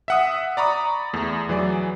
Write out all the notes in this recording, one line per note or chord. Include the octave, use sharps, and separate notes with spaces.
E5 F#5 D#6
D5 A#5 B5 C#6 D#6
E2 A3
E3 F#3 G#4 D5